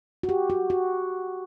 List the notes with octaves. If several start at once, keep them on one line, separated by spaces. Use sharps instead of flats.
F#4
G4
F#4
F#4